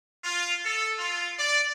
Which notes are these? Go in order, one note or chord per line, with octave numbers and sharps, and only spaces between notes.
F4
A4
F4
D5